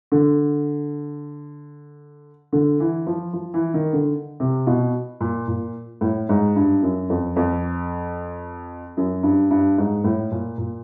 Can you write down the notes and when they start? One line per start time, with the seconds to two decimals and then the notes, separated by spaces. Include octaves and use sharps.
0.12 D3
2.53 D3
2.80 E3
3.07 F3
3.33 F3
3.54 E3
3.74 D#3
3.93 D3
4.40 C3
4.67 B2
5.21 A#2
5.48 A#2
6.01 A2
6.29 G#2
6.56 G2
6.83 F#2
7.10 F2
7.36 F2
8.97 F#2
9.23 G2
9.51 G2
9.78 G#2
10.04 A2
10.31 A#2
10.58 A#2